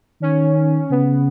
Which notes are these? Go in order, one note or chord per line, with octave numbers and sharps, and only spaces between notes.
D#3 C#4
C#3 B3